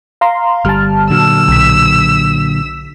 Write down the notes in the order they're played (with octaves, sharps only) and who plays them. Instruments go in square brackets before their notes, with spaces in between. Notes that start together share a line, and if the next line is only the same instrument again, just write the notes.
[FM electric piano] F5 A#5 C6
[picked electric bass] G1 G3 [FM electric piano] A5 F6
[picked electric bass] A#2 D3 F#3 [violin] E6
[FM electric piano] B1 B6